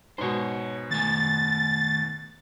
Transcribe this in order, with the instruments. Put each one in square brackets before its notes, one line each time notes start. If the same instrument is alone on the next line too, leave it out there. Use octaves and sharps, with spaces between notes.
[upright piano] G#2 B2 [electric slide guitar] C5 C#5
[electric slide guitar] D#3 A3 G#5 [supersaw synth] A6